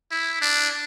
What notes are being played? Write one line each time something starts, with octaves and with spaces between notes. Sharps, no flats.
E4
D4